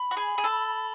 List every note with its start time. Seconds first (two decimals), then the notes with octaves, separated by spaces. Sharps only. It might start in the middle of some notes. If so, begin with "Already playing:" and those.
Already playing: B5
0.11 F#4
0.17 G#4
0.38 G#4
0.44 A4